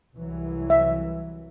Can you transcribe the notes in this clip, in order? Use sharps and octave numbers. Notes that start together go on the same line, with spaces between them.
C2 E3 F#3
E5